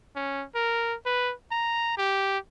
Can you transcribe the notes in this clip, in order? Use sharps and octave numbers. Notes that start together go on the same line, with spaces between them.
C#4
A#4
B4
A#5
G4